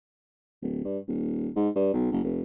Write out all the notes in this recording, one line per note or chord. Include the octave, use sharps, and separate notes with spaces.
D1
G2
D#1
G#2
G2
B1
F#1
F1